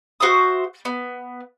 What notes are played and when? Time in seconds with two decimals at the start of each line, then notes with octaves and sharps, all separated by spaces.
0.20 F#4 C5 E5 D#6
0.85 B3